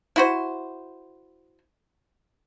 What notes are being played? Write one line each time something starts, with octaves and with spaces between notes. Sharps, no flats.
E4 F#4 C5